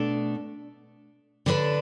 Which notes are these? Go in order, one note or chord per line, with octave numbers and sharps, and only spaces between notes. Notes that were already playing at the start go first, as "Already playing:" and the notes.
Already playing: B2 A3 D4 A4
D3 B3 D4 B4 D5